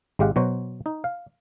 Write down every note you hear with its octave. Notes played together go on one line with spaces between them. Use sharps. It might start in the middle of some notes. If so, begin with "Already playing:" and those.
G#1 G#3 G4 F5 F#5
B2 F#3 F#4 C5
D#4
F5